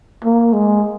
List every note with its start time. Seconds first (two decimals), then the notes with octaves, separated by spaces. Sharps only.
0.24 A#3
0.53 G#3